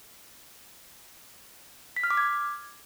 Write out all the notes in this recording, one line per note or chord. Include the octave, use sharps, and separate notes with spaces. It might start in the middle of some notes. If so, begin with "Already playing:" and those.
B6
F6
D6
G#6